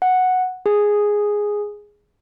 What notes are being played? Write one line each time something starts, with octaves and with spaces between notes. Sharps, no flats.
F#5
G#4